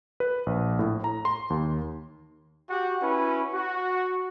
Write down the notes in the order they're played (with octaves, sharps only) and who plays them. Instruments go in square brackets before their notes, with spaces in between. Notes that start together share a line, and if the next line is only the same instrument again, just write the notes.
[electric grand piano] B4
A#1
A2
A#5
C6
D#2
[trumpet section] F#4 G4 F#5
C#4 E4 F#4 B4
F#4